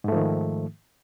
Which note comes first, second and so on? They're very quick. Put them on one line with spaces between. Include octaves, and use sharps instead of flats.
G#2 A3 F3 D#3